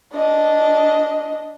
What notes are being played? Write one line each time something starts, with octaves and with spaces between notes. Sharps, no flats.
D4 D#5